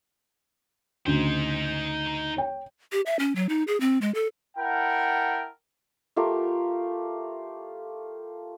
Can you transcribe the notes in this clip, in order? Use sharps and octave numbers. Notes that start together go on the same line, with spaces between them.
D2 C#3 D#4 C5
C#5 G5
G4
E5
C#4
F#3
D#4
G#4
C4
G#3
A4
E4 A#4 F#5 G5 A5
A3 F4 G4 A#4